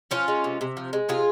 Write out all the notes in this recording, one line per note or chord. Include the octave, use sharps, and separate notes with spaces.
F3 C#4 F4
G#3
C3
C3
F3
G#3
C3 F4 G#4